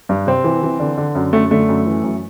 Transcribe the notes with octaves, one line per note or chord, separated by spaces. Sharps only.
G2
C3 C4
E3
E3
D3
D3
F#2
F#2 A3
D3 A3
F#2
E3
F#2